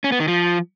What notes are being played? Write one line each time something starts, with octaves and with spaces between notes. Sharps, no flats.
C#4
B3
D#3
F3